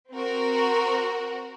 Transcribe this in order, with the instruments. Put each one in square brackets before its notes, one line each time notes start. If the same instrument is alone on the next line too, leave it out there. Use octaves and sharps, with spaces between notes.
[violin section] C4 F#4 A#4